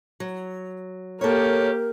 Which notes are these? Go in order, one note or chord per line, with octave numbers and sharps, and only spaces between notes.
F#3
A#3 G4 A4 A#4 C#5